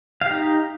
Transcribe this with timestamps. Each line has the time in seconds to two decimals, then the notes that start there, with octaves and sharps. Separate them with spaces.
0.21 F5
0.26 G4
0.31 D#4